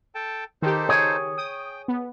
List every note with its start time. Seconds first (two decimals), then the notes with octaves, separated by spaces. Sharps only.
0.15 A4 G5 A5
0.62 D#3 D#4 G4 A4 C5
0.89 G#4 C#5
1.38 G5 D#6
1.88 B3